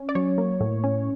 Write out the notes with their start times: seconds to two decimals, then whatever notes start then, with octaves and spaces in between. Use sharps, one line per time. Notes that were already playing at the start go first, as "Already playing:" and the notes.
Already playing: C#4
0.09 D5
0.15 F#3 C#5
0.38 A#3
0.61 A2
0.84 C#4